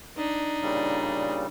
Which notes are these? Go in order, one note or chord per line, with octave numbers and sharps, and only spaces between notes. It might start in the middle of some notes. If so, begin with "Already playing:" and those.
D4 D#4
A#2 C#3 G3